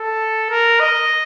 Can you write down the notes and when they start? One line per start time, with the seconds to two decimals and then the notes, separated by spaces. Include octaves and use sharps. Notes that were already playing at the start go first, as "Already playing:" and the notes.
Already playing: A4
0.50 A#4
0.80 D#5